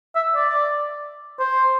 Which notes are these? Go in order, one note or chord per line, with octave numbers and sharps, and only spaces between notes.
E5
D5
C5